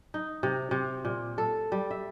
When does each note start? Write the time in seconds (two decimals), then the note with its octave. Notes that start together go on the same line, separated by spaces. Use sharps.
0.14 D#4
0.43 C3
0.71 C3
1.05 A#2
1.38 A4
1.72 G3
1.91 E5